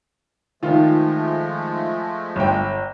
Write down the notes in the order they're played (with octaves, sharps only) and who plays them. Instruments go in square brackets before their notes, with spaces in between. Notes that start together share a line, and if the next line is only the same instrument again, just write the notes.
[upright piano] D#3 F4 [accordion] F3 G#3 A3
[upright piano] G1 G5